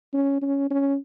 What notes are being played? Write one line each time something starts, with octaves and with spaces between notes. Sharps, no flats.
C#4
C#4
C#4